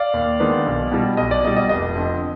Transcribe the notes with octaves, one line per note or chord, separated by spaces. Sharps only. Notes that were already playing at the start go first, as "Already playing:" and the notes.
Already playing: D5 F5
D#2
D#3 G#3 B3 D4
B1
B2 G3
B1 D#5
D5
B2 G3 D#5
D#5
F1 D#5
F2 D3